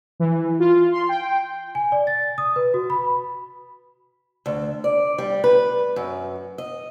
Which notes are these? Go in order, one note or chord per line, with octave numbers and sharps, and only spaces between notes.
E3
F4
C6
G5
G#5
D5
A6
D#6
B4
F#4
B5
D2
D5
G3
B4
F#2
D#5